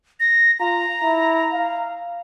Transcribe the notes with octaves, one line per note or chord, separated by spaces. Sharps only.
A#6
F4 A#5
E4
F5